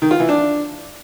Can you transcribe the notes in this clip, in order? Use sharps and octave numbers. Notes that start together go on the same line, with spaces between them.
D#3
F4
E3
D4